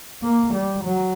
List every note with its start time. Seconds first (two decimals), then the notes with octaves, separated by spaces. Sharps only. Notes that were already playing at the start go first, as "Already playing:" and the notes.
0.23 A#3
0.54 G3
0.85 F#3